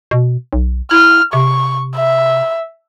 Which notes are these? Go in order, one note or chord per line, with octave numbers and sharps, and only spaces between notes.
B2
B1
E4 F6
C3 C#6
E5